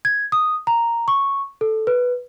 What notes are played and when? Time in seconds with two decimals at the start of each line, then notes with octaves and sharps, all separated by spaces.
0.05 G#6
0.32 D#6
0.67 A#5
1.08 C#6
1.61 A4
1.87 B4